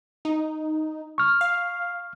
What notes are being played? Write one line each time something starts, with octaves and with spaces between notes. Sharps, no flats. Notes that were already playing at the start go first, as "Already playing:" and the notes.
D#4
C#6 F6
F5